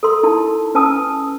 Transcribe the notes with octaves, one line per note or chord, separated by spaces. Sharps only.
A4 A#4 C6
D#4 E4 A5
C#4 B4 G#5 A5 D#6 E6